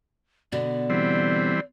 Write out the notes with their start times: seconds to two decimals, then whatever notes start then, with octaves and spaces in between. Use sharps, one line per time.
0.52 B2 D3 D5
0.90 E3 G3 C4